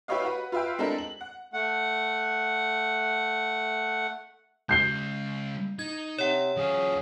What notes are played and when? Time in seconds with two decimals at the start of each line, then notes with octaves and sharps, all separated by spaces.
0.08 E4 G4 B4 C#5 D#5 F5
0.25 F#4 B4
0.52 F4 B4 E5 F5 G5
0.78 G#3 C4 D4 E4 A4 A#4
0.98 F#7
1.21 F#5
1.53 A3 F#5
4.69 C#3 G#3 G6 C7 G7
5.79 D#4 G#6
6.18 C3 C#5 F#5
6.57 F#3 C#4 F4 G#4